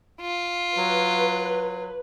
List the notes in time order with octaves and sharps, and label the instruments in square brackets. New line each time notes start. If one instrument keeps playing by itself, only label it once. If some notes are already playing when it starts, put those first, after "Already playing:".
[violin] F4
[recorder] F#3 [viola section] B4